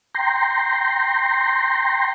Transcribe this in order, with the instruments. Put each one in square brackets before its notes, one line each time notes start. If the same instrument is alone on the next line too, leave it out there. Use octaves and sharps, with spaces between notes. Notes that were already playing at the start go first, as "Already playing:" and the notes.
[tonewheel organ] G5 A#5 C6